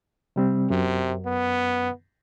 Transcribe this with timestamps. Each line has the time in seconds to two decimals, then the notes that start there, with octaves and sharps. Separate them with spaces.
0.36 C3 G3 C4
0.70 F#2 C3
1.26 B3